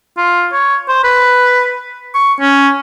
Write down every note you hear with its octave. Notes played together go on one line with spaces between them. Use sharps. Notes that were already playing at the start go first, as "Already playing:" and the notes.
F4
C#5
C5
B4
C#6
C#4